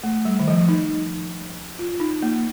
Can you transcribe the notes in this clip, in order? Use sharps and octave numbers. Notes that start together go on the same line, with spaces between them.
A3
G3
D#3
F3
D#4
F4
D#4
A#3